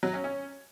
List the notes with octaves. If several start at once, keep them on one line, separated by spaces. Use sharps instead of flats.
F#3
C#4
C#4